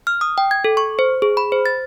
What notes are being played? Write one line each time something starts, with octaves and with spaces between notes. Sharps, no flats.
F6
D#6
G5
G#6
A4
C#6
C5
G#4
B5
C5
A6